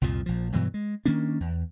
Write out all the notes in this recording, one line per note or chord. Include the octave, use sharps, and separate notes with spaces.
C2 F2 A#2 F3
A#1 F3
G2 B2 E3 F#3
G#3
D#3 A#3 C#4 D4
E2